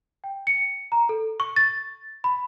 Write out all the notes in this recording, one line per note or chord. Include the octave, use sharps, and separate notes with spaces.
G5
C#7
A#5
A4
C#6
A6
B5